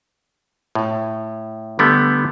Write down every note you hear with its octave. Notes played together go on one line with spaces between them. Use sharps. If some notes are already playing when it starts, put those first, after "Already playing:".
A2
D3 G3 A3 B3